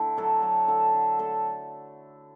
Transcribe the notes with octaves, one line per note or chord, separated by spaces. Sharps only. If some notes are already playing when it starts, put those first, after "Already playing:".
Already playing: D3 A3 E4
F#3 A4
F#3 A4
D3 A4
D3
A3 A4